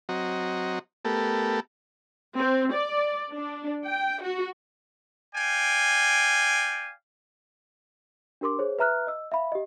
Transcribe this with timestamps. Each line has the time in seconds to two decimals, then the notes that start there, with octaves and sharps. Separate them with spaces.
0.09 F#3 C4 F#4 D#5 A#5
1.05 A3 B3 G4 A4 A#4
2.38 C4
2.73 D5
3.31 D4
3.85 G5
4.22 F#4
5.35 D5 F5 G5 G#5
8.41 D4 G4 A#4 C6 D6
8.59 G#4 C5 C#5
8.79 B4 E5 A#5 F6 F#6
9.07 D#5 E6
9.32 E5 F5 B5
9.52 G4 D#5